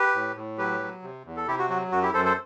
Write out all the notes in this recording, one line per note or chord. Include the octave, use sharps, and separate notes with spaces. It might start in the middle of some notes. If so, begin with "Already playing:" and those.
Already playing: G4 B4
A2
A2
F#3 G4 B4
F#3
C3
E2
A4
C3 E4 G4
F#4
F#3 F#4
F#2 F#4
E4 G4
F#2 A4 C5
A4 C5